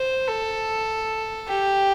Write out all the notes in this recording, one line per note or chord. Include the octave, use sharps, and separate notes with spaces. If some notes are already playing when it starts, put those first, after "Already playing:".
Already playing: C5
A4
G4